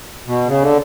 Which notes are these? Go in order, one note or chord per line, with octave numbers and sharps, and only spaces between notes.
B2
C#3
D3